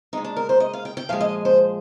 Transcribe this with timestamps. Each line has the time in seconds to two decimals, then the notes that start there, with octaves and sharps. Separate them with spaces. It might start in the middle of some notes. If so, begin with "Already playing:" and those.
0.13 A#2 G#3 D#4
0.25 D4
0.37 A#4
0.49 C5
0.60 D#5
0.74 F5
0.85 G5
0.97 G5
1.09 A#2 F3 G#3 F5
1.21 D#5
1.45 C5